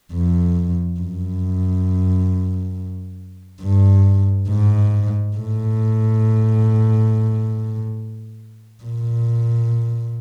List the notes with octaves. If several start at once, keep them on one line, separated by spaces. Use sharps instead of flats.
F2
F#2
G2
G#2
A2
A#2